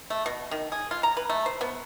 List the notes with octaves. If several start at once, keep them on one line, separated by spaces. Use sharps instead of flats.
A3
B2
D#3
G#4
F4
A#5
B4
A3
C5
B3